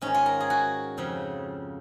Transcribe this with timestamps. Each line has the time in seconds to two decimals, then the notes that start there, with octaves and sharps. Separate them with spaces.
0.02 G#2 D#3 C#4
0.14 F4
0.26 A#4
0.40 G#4
0.50 F#4
0.98 F2 C#3 F3